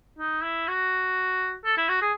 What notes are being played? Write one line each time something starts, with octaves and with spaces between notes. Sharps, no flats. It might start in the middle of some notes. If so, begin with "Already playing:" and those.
D#4
E4
F#4
A4
E4
F#4
G#4